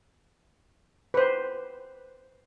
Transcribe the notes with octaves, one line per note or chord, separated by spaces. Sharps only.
B4 C5